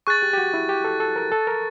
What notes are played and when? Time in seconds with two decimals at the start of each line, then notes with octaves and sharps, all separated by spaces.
0.07 G#4 C#6 F#6 A6
0.22 G4
0.33 G4
0.38 F#4
0.54 E4
0.69 G4
0.84 A4
1.00 A4
1.16 A#4
1.32 A4
1.47 A#4